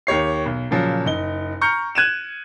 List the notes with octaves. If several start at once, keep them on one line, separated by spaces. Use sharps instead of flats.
D#2 G4 C#5 C7
B1
A#2 C#3 F3 F#3
F#1 D#4 G7
A#5 C#6 F6 G6 C#7
F#6 G#6 D#7 E7